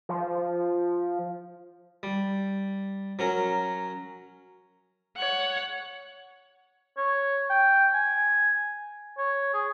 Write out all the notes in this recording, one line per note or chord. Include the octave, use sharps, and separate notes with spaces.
F3
G3
F#3 C#4 A#4
C#5 F#5
C#5
G5
G#5
C#5
G#4